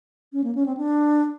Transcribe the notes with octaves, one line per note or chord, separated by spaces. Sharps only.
C#4
A#3
C#4
C4
D4